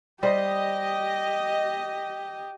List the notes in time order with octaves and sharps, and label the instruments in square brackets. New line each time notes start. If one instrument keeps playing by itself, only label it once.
[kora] G3 C5 [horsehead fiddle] G4 [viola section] D#5